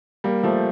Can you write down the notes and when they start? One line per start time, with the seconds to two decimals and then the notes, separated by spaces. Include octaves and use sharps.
0.24 G3 A#3
0.43 F3 A3